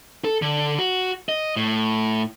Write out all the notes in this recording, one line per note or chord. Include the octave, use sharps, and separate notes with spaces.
A4
D3
F#4
D#5
A2